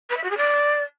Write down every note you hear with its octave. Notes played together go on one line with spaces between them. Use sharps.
B4
E5
F#4
G#4
D5